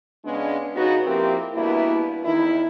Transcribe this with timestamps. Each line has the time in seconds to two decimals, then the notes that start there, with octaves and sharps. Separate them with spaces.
0.25 C#3 G#3 B3 C#4 D4
0.75 C#3 B3 D#4 F#4
1.06 F3 A#3 C4 E4 G4 A#4
1.55 G2 B2 A#3 B3 E4
2.24 E2 D#3 E4